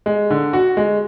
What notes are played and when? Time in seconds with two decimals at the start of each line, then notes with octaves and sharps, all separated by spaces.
0.06 G#3
0.30 D3
0.53 F#4
0.77 G#3